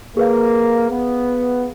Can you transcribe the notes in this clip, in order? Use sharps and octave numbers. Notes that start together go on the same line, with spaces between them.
A#3 G#4 B4 F5
B3